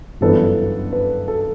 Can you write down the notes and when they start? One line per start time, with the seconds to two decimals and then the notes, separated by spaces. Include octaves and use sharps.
0.21 G1 F#2 E3 B3 D4 A4
0.93 B4
1.28 A4